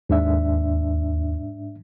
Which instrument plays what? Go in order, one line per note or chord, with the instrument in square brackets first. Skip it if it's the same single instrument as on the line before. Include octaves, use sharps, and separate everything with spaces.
[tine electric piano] D#2 [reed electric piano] G#2 D4 E5